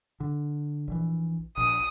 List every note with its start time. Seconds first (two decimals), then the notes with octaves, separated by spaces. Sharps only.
0.20 D3
0.88 A#1 E3
1.57 A#1 D#6